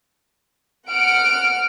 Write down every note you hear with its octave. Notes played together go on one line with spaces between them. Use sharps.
F#5 F6 D7